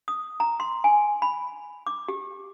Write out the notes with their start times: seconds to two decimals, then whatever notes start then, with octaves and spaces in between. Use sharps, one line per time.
0.08 D#6
0.40 A#5
0.60 C6
0.84 G#5
1.22 B5
1.87 D6
2.08 G4